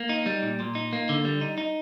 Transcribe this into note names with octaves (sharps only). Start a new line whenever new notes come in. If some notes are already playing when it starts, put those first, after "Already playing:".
Already playing: A#3
D#4
G3
A#2
A#2
D#4
A#3
D3
G3
D#4
D#4